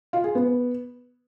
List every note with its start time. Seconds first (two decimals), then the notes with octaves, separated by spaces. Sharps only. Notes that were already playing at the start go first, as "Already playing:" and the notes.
0.13 F4
0.24 G#4
0.35 B3